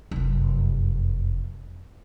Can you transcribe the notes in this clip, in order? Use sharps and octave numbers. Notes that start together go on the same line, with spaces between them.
F1 F#2